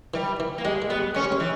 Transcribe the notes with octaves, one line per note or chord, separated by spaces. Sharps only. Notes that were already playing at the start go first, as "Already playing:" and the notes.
E3 G3
E3
A#3
G3 G#3
G#3
G3 B3
G#3 C#4
G3
G#3
E3